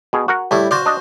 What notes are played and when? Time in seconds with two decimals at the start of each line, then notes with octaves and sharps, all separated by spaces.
0.13 B2 G#4
0.28 F#4 A#4 F#5
0.51 A2 G3 E4
0.71 F#4 C5 D5 F5
0.86 D4 D#5